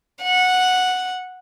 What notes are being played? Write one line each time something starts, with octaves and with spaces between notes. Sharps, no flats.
F#5